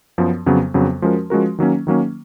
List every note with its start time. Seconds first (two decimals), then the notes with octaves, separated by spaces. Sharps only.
0.18 F#2 F3 B3
0.46 F2 C#3 F#3 B3
0.74 F2 C#3 F#3 B3
1.02 F3 G#3 C#4 F#4 A#4
1.30 F3 G#3 C#4 F#4 A#4
1.59 D#3 F#3 A#3 C#4
1.87 D#3 F#3 A#3 C#4